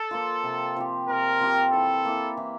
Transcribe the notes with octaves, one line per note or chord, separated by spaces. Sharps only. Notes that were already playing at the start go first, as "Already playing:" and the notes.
Already playing: A4
F3 A#3 F4
C3
F3 C4 G4
C3 A#4
F3 C4 G4
E3 A4
A#3 E4
E3